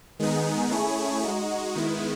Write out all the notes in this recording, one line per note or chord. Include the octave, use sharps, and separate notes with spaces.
D#3 G#3 B3 D#4 G#4
A3 C#4 E4 G#4 C#5
G#3 D#4 F#4
D#3 G#3 B3 E4